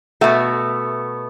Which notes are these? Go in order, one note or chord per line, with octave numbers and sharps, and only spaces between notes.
B2 A3 F#4